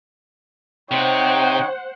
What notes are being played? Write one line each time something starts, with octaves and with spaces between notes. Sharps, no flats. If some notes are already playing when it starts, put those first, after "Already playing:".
C3 D#4 C5 C#5 F#5 G5